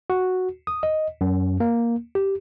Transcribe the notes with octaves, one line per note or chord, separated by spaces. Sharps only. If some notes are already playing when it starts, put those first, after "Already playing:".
F#4
D#6
D#5
F#2
A#3
G4